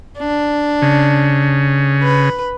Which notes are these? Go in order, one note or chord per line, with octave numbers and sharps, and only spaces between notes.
D4
C#3
B4